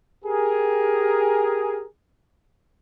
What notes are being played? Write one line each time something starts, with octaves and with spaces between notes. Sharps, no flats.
G4 G#4 A#4